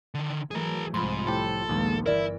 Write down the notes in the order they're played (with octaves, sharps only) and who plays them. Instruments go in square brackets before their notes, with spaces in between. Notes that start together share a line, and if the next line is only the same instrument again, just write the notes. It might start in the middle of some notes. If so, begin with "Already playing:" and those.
[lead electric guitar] D3 D#3
[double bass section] E3 F#3 A3 [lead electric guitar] G#4 A#4
[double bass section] C2 F3 [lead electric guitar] G#2 [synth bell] B5 C6
[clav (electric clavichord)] A2 G4 [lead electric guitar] A4
[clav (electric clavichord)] A#1 D#2 [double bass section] G#3 A#3 B3
[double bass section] G1 E3 [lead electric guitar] E4 [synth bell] A#4 D5